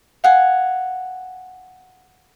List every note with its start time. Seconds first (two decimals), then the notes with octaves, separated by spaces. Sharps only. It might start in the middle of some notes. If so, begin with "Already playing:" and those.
0.24 F5 F#5 G#5